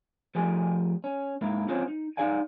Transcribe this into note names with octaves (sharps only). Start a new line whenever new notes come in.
F3 A3 G4 G#4 G#5
C#4
G#2 A#3 E4
C4 C#4 F4 G#4 C5 C#5
D#4
D#4 F4 G#4 D5 F5 G#5